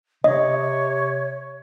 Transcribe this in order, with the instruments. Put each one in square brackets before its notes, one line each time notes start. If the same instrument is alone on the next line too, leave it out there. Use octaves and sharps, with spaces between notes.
[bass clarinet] C3 [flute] C#5 [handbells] D#5